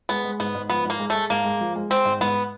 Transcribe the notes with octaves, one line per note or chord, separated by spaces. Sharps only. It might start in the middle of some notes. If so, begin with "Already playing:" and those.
G#3 B3
G#3
G#2 B3
G#2
F3 B3
G#2 A#3
G#3
A3
G#3
G#2 A#3
G#3
F3
G#3
G#3 C4
G#2
G#2 B3